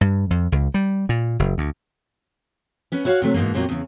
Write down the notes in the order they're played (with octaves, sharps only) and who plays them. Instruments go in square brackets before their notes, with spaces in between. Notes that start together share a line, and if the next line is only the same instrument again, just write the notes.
[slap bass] G2
F2
C#2
G3
A#2
F#1
D2
[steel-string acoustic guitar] B3 C#4 B4
E4 F#4 C#5 D#5 F5 F#5
C3 F#3 A3
G#2 B2 D#3 E3 A#3
F2 A#2 F#3 A#3 F#4 G4
E2 C#3